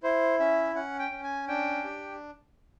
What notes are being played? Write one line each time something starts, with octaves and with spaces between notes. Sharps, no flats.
E4 C5
C#4 E5
C#4 F#5
G5
C#4
G#5
D4 G5
G4